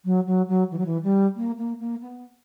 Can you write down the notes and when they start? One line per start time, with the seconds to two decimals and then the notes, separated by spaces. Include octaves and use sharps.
0.05 F#3
0.27 F#3
0.48 F#3
0.71 E3
0.78 F#3
0.85 E3
1.03 G3
1.36 A#3
1.58 A#3
1.80 A#3
2.01 B3